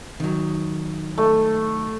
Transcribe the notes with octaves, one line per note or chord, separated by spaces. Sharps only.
D#3 F#3
A3